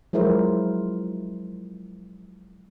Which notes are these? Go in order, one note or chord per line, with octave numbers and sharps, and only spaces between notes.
F3 F#3 G#3 E4 A#4 C5